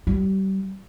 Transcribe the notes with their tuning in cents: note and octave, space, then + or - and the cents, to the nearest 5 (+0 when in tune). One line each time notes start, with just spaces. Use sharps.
G3 -30